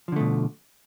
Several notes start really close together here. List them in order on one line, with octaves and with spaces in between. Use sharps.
F3 D3 A3 B2